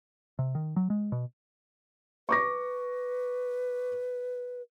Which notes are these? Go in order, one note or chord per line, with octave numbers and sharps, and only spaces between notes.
C3
D#3
F#3
G#3
B2
B4 C#6 D6 A#6